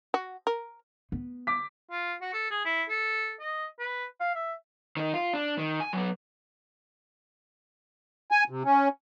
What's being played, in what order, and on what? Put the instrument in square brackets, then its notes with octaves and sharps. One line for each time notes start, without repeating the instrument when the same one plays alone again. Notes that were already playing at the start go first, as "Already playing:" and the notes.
[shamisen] F#4
A#4
[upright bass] B3
[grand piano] D6 B6
[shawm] F4
F#4
A4
G#4
E4
A4
D#5
B4
F5
E5
[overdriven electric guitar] D#3 D#4
F4
D4
D#3
G#5
F#3 B3
[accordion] G#5
C3
C#4